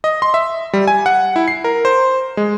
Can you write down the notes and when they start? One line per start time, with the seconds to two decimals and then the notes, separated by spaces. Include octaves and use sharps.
0.04 D#5
0.22 C6
0.34 E5
0.73 G3
0.88 G#5
1.06 F#5
1.36 E4
1.48 C7
1.64 A#4
1.85 C5
2.37 G#3